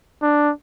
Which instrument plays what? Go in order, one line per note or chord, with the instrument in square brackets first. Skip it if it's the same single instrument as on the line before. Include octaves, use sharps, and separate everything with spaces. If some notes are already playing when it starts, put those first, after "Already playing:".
[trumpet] D4